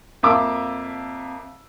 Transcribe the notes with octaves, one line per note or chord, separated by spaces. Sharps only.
F2 A#3 E5 A5 D6 E6